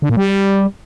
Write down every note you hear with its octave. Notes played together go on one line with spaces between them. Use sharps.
D3
A#2
G3